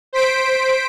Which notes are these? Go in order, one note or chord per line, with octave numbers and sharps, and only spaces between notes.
C5 B6 D7